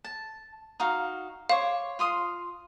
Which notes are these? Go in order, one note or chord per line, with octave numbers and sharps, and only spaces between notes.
A5
D#4 F#4 F5
C5 C#5 F5 D6
F4 C6 D#6